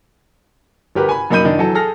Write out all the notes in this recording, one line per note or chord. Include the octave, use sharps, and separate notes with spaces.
G1 G4 A#4 B4
G#5 B5
F#2 A#3 D#4 B5 G6 D#7
D#3 E3 D4 D#4
E3 F#3 A4
G#4 A4 F6 A#6